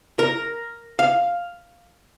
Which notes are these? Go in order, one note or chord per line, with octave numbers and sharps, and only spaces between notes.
A#4
F5